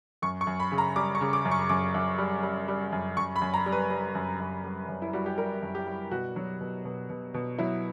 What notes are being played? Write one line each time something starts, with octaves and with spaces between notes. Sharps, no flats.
F#2 C#6
C#6
F#2
B5
C#3
A#5
G3 D6
C#6
C#3
D6
F#2
C#6
F#2 D6
F#2
G3
G3
G3
F#2
F#2 C#6
B5
F#2
A#5
G3
B4
G3
F#2
F#2
G3
F#2
E4
G3 F#4
G4
G3 A#4
F#2
G4
G3
B2 F#4
F#3
B2
B2
B2
B2
F#3 E4